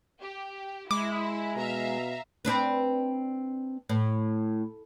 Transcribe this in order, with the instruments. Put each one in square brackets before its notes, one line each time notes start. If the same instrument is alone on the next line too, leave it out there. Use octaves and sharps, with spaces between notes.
[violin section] G4
[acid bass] G#3 [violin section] E4 [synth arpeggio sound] D6
[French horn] B2 [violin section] E5 F5 A#5
[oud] C4 D4 B4
A2